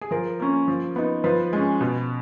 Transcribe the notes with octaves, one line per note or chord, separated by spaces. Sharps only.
G#4
F3 A#4
A#3 C#4
F3
B3 D#4
F3 B4
G#3 C#4
B2